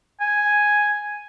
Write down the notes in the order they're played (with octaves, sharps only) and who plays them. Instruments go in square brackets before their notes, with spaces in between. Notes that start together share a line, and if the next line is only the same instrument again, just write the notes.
[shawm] G#5